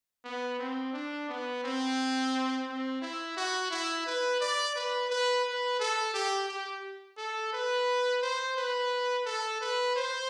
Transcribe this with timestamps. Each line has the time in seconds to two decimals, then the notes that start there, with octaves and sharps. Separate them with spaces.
0.24 B3
0.59 C4
0.93 D4
1.29 B3
1.63 C4
2.67 C4
3.01 E4
3.37 F#4
3.70 E4
4.06 B4
4.40 D5
4.75 B4
5.10 B4
5.44 B4
5.79 A4
6.14 G4
6.48 G4
7.17 A4
7.53 B4
8.22 C5
8.57 B4
9.26 A4
9.61 B4
9.96 C5